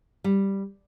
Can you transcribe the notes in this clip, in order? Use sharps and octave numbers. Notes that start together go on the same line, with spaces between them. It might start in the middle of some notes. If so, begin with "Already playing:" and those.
G3